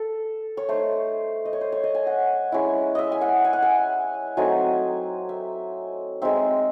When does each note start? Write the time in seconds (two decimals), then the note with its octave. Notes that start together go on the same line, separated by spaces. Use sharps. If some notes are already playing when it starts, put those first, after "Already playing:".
Already playing: A4
0.57 C#5
0.69 A3 D#4 C5
1.45 D#5
1.53 C#5
1.61 C5
1.72 C#5
1.84 D#5
1.95 G#5
2.07 F#5
2.52 G#3 C#4 E4
2.95 D#5 E5
3.12 G#5
3.21 F#5
3.45 G#5
3.53 F#5
3.62 G#5
4.37 F#3 A3 C4 D#4 G#5
5.29 E5
6.22 G#3 C4 D#4 E5